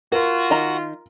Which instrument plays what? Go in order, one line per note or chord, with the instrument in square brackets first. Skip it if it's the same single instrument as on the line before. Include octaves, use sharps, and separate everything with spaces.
[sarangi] F4 [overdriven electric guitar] F#4 [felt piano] A#4
[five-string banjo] D#3 D#5 A#5